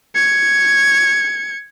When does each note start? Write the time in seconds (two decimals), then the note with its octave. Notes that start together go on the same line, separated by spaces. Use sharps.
0.15 G#6 C#7